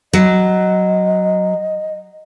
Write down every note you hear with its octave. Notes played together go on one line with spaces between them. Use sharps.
F#3 D#5